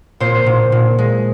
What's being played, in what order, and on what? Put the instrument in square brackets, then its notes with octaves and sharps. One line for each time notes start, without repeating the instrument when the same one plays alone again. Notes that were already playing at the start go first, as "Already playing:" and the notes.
[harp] A#2 C5
A#2
A#2
G#3